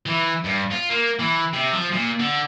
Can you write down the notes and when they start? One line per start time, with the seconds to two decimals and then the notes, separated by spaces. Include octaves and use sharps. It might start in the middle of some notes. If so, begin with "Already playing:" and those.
0.06 E3
0.44 G2
0.71 F4
0.90 A#3
1.19 E3
1.53 C3
1.73 F3
1.92 A#2
2.19 D3